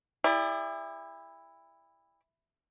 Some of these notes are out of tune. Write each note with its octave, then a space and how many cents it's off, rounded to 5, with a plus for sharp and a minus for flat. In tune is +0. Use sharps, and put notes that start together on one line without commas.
E4 +0 G4 +45 D5 +0